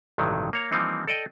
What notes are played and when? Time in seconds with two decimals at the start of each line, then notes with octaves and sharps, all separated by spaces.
0.18 A1 G2 C3 D#3 F#3
0.53 A#3 C#5 A#5
0.71 E3 F3 G3 A#3 C4 D#4
1.07 A4 D5 D#5 G5